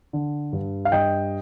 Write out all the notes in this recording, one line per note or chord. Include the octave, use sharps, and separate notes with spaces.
D3
G2
F5
G2 D#5 G5